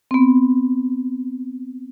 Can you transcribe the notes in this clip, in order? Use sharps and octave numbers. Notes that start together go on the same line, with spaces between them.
B3 C4